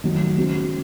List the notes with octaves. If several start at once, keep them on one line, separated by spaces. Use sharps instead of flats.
D#3 F#3 A3 D#4
C#3 G#3 C4 F#4